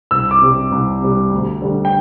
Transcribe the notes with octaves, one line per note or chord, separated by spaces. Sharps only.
C2 E6
D6
C3 G3
C2
C3 G3
D2
D3 G3
G5